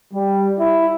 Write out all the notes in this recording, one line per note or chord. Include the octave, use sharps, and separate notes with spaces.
G3
E4